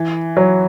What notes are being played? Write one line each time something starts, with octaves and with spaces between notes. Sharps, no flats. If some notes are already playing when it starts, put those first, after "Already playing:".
Already playing: E3
F#3